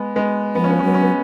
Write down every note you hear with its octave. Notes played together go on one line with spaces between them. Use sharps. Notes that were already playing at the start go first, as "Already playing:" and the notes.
Already playing: G#3 B3
G#3 B3
F3 B3
C#4
B3
C#4
F#3 B3
C#4
B3